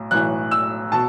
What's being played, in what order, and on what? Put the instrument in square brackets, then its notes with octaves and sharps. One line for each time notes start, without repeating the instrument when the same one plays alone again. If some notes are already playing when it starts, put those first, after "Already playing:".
Already playing: [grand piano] B1 A2
B1 A2 E3 F#6
E6
B2 A5